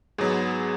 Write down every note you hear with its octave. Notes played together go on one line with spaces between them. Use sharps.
G#2 F#3 B3 G#4